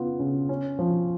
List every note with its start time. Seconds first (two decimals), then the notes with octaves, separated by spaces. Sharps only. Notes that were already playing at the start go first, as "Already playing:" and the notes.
Already playing: C#3 B3 F4
0.19 C#3
0.49 C#4
0.79 F3